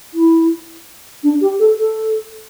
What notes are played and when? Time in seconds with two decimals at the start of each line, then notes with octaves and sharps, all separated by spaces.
0.14 E4
1.23 D4
1.41 G4
1.59 A4
1.78 A4